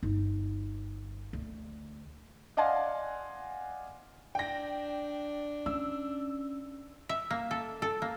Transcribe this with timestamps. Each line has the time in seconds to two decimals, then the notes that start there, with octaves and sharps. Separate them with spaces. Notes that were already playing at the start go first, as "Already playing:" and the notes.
0.03 G1 D#4
1.33 D2
2.57 D5 D#5 F5 F#5 G#5 C6
4.35 D4 G5 A#6
5.66 C#4 E6
7.09 E5
7.30 A#3
7.51 A4
7.82 A4
8.02 A#3